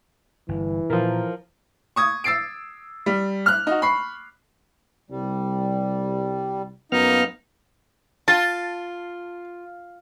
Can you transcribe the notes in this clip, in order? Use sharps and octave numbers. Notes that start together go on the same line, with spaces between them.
G1 E3
A#2 F3 A#4
C#6 D#6 G#6
E6 A6 C7 D7
G3
F6 F#6
D#4 F#4
B5 C#6 C7
C2 G3
F#2 A#3 B3 D#4 F6
F4 A5